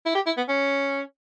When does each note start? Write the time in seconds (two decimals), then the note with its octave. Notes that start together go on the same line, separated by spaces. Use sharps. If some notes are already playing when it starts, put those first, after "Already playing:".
0.06 E4
0.15 G4
0.26 E4
0.37 B3
0.49 C#4